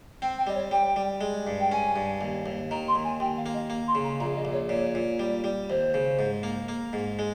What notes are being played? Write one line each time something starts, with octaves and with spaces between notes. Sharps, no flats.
C4 G5
G5
G3 D#5
C#5
G3 G5
G3
G#3
G2
G5
C#4 G#5
G2
D#2
D#2
D#3 A#5
C6
D#2
G#5
D#2 G5
F5
A#3
D#5
A#3
C6
C#3
A#5
A#1 A#5
D#5
A#1
C#5
A#2 C#5
A#2
G3
G3
D#2 C5
C#3
G#2
A#3
A#3
G#2
G#3